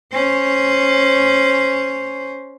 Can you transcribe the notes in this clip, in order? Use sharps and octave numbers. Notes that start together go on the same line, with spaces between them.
C#4 C5